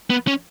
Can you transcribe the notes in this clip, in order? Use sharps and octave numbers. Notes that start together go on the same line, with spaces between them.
B3
C#4